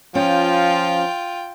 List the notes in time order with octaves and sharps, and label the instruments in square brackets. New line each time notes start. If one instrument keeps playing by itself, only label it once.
[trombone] F3 [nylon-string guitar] C#4 [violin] F4 G5